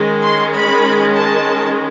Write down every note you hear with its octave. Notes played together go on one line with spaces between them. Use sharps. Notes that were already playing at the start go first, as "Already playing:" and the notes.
Already playing: D#3 G#3 C#4
C6
B5
A5